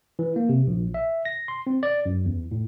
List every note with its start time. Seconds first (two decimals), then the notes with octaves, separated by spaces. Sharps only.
0.19 E3
0.36 A#3
0.49 C3
0.67 A#1
0.94 E5
1.25 A#6
1.48 C6
1.67 C4
1.83 D5
2.06 F#2
2.25 E2
2.51 A2